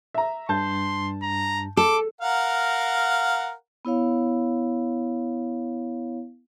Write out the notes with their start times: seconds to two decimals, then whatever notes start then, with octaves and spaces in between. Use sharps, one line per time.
0.14 E5 A#5
0.49 G2 A5 C6 G6
1.23 A#5
1.77 A4 D6
2.21 A#4 F5 F#5
3.85 B3 E4 C#5 F5